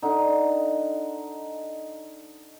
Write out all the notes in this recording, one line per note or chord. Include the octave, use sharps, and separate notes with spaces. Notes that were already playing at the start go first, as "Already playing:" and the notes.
D3 D#4